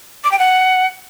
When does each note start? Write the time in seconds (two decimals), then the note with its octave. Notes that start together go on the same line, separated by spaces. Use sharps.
0.24 D6
0.32 G5
0.39 F#5